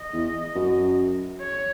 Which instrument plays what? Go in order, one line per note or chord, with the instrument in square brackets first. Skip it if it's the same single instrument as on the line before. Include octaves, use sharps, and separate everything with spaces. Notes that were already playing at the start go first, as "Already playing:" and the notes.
Already playing: [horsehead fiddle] D#5
[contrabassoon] E2
F#2
[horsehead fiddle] C#5